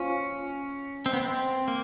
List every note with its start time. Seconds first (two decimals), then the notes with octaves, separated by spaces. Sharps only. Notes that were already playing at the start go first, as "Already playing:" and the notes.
Already playing: C#4 F4 C5
1.05 C4 C5 D#5 G5
1.13 B3
1.21 C4
1.68 A#3